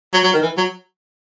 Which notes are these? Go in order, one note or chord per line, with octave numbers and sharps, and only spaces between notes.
F#3
F#3
D#3
E3
F#3